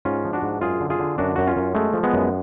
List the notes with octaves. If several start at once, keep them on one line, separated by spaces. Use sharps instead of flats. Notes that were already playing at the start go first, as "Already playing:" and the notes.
G#2 C#4 F4
F3
D4 F#4
G#2
F#2 F4 G#4
D3
F4 G#4
D3
F#2 D4 F#4
F#2 F#4
C#4 F4
F#2
G#3 A3
F3
G#3 B3
F#2